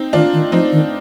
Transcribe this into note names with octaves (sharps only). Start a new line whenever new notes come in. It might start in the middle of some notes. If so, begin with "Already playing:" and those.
Already playing: C4 D#4
D#3 D4 F4
D#3
F3 C4 D#4
D#3